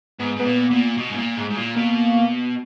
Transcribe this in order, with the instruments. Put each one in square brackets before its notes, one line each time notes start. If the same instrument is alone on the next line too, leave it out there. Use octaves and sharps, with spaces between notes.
[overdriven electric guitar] G#2 [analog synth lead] B3
[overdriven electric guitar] G#2 [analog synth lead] B3
[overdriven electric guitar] A#2
A#2
B2
G#2
A#2
G#2
G#2
A#2
[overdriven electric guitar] B2 [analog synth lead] A#3